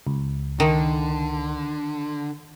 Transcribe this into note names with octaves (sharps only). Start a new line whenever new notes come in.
C#2
D3 D#3